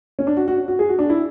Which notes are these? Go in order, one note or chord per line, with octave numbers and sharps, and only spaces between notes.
C#4
D4
F#4
F#4
F#4
G#4
F#4
D4
E4